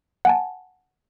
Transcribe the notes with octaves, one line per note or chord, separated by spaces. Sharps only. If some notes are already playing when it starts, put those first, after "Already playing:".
F#5 G#5 A5